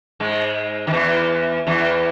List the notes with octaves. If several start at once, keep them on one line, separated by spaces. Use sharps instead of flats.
G#2 G#3
D#3
E2 E3
E2 E3